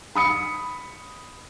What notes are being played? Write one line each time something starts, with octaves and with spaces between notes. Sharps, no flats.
B5 D#6 C#7